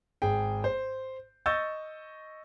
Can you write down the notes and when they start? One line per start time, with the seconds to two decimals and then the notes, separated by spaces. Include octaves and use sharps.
0.22 G#1 G#4 G5
0.64 C5
1.46 D#5 C#6 E6 G6 A6